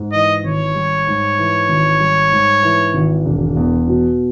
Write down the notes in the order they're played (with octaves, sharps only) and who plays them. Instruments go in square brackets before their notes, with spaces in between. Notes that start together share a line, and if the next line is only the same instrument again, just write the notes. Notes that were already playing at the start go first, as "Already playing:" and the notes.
Already playing: [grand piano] G#2
[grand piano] E3 [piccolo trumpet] D#5
[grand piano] G#1 [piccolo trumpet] C#5
[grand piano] G3
G#2
E3
G#1
G3
G#2
E3
G#1
E1
E2
B2